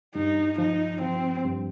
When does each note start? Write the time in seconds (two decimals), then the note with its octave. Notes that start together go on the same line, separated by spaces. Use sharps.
0.15 G2 D#4
0.58 F3 D#4
1.01 F3 C4
1.45 G2